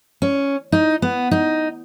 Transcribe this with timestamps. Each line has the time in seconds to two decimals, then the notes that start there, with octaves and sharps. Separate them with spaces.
0.22 C#4
0.72 D#4
1.02 B3
1.31 D#4